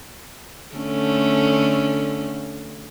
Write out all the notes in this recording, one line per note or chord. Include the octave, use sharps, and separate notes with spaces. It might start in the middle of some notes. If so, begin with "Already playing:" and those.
D3 A3 C#4